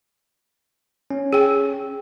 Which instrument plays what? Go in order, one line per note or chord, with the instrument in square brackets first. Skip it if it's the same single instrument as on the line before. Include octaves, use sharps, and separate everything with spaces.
[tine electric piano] C#4
[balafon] G#4 G5